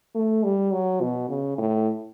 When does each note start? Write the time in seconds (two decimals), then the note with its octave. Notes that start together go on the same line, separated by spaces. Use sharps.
0.15 A3
0.43 G3
0.72 F#3
1.01 B2
1.29 C#3
1.58 A2